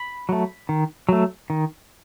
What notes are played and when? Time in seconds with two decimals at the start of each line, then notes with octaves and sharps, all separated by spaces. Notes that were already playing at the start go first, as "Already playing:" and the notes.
Already playing: B5
0.29 F#3 A3
0.69 D#3
1.09 F#3 A3
1.50 D#3